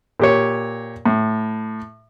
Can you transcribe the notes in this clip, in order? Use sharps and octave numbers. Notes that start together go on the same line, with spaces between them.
A#2 G4 C#5
A2